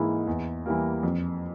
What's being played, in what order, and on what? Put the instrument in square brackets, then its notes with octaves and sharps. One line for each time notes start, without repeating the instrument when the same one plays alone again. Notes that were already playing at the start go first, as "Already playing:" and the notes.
Already playing: [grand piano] G#2 E3 A#3 E4 G#4
E2
E3 G3 A#3
F2